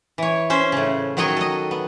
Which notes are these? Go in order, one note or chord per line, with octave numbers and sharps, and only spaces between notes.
E3 C#5
C#4 C5 E5
A2 C#3
D#3 F#3 F#4 C#5 D#5 G5
A4 D#5
B3